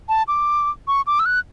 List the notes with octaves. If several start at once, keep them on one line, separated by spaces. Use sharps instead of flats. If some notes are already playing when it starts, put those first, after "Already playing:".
A5
D6
C#6
D6
E6
F#6